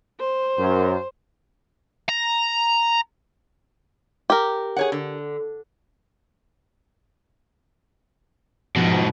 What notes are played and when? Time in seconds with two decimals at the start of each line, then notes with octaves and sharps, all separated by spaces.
0.20 C5
0.58 F#2
2.09 A#5
4.30 G4 A#4
4.76 G#4 C#5 F#5
4.92 D3
8.76 G#2 B2 F3